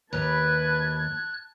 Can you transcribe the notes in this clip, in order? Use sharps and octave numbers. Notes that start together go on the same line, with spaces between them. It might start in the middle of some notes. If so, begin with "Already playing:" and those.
D#2 G4 B4 A5 F#6 G#6